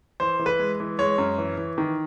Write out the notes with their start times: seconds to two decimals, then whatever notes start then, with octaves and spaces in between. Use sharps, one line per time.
0.20 E3 C5
0.39 E3
0.46 B4
0.59 G#3
0.80 E3
0.99 G#3 C#5
1.18 F#2
1.38 E3
1.57 E3
1.78 D#3